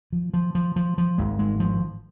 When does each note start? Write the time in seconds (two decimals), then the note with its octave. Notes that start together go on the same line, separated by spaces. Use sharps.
0.12 F3
0.34 F3
0.55 F3
0.76 F3
0.98 F3
1.18 G#1 G#2 G#3
1.39 G#3
1.60 F3